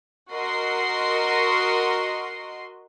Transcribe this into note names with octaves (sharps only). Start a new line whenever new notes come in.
F#4 A#4 D#5 C6 C7